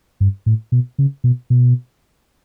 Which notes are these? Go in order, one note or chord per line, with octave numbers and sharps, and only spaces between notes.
G2
A2
B2
C#3
B2
B2